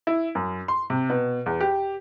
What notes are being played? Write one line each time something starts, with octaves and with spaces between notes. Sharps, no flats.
E4
F#2
C6
C3
B2
E2
G4